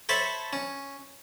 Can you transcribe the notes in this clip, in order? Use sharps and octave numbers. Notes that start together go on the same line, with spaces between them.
A4 C5 C#5 E5 A5 B5
C#4